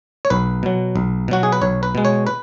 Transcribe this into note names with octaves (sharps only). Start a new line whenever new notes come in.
C#5
B1 B4
B2 F#3
B1
B2 F#3 F#4
G#4
B4
B1 C#5
B4
B2 G#3
C#5
B4